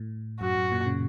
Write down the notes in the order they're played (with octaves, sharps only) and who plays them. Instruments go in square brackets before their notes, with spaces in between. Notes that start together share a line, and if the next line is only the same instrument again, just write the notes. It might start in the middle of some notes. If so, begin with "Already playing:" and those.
Already playing: [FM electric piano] A2
[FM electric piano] F#2 [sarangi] F#4
[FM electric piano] F#2
A#2
C#3